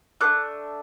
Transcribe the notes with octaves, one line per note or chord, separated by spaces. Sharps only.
A3 D4 A4 D6 F#6